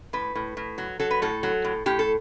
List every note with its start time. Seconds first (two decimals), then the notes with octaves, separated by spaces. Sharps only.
0.13 A2 B4
0.35 A2
0.57 A2
0.78 F#3
1.00 F#3 A4
1.11 B4
1.22 A2 A4
1.43 F#3
1.64 A2
1.86 A2 G4
1.99 A4